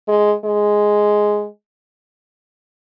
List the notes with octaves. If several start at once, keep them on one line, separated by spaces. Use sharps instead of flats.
G#3
G#3